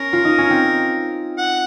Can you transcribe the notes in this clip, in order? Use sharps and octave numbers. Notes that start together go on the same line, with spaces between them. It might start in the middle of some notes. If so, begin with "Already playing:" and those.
Already playing: C#4 A#4
F4
D#4
C#4
C4
F#5